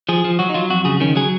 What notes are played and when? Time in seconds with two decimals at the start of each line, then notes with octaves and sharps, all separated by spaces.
0.09 F3 G#4
0.25 F3
0.39 F#3 F#4
0.49 D#4
0.54 F#3 F4
0.70 F2 F#4
0.85 C#3 G#4
1.00 D#3 C#4
1.16 F#3 G#4